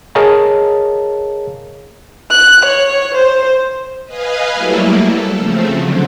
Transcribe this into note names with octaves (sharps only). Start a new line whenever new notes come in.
G#4 A#4 C#5 D#5 F5 A5
F#6
C#5
C5
B4 D#5 F5 G#5
F#3 G3 A3 A#3 E4
A4
C#3 F3 A3 C4
D3 F#3